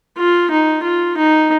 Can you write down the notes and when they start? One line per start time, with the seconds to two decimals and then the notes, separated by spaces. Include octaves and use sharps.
0.18 F4
0.51 D#4
0.84 F4
1.18 D#4